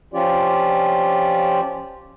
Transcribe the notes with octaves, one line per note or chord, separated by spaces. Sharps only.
F3 C#4 F4 G4 D5